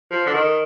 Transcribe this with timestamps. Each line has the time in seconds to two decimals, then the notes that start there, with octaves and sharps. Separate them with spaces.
0.11 F3
0.26 D3
0.34 D#3